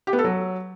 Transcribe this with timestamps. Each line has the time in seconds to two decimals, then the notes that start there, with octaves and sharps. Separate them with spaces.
0.07 G4
0.13 B3
0.19 A4
0.24 F#3